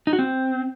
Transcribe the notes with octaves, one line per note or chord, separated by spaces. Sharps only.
D#4
F#4
C4